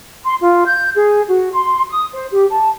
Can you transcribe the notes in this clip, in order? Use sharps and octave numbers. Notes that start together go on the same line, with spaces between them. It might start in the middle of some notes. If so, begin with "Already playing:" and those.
C6
F4
G6
G#4
F#4
C6
D#6
C5
G4
A5